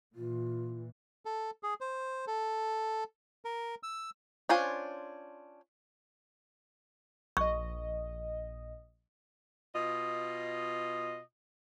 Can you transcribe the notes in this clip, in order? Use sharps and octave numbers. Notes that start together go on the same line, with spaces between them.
A#2 E3 F4
A4
G#4
C5
A4
A#4
E6
C#4 D4 F4 C5 G#5
A#1 D#5 C#6
B2 F4 D#5